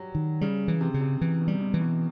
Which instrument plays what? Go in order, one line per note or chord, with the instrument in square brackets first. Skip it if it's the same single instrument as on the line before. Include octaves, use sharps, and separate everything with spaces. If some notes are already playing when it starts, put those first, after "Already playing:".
Already playing: [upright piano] F#3 G3
[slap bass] D#3
[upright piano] C#3 [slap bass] G3
[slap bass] E3
[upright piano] C3
[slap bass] C#3
[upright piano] C3
[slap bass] E3
[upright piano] B2
[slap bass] G3
[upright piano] B2
[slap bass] E3
[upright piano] B2